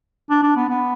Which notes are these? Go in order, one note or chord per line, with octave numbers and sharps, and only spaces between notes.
D4
D4
B3
B3